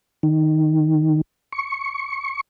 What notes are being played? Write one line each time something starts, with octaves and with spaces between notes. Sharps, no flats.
D#3
C#6